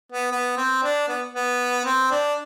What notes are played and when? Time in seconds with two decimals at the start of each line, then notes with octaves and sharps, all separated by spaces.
0.12 B3
0.32 B3
0.57 C4
0.83 D4
1.08 B3
1.34 B3
1.85 C4
2.11 D4